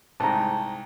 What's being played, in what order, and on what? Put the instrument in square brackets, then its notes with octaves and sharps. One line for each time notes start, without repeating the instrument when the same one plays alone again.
[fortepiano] C2 G#2 [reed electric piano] A5 A#5